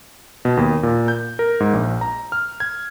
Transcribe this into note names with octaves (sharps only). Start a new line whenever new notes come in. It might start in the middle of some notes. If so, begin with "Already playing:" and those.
B2
D#2
A#2
G6
A#4
G#2
A#1
A#5
F6
G#6